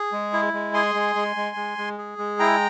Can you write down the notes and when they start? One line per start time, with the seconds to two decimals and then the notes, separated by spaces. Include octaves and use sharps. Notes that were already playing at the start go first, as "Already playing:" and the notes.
Already playing: G#4
0.12 G#3
0.33 E4
0.53 G#3
0.74 G#4 G#5 C6
0.95 G#3
1.15 G#3
1.36 G#3
1.56 G#3
1.78 G#3
1.98 G#4
2.18 G#3
2.39 E4 G5 A#5